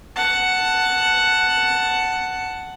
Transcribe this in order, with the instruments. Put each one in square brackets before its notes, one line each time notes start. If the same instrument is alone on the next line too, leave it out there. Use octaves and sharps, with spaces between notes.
[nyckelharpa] F#5 A5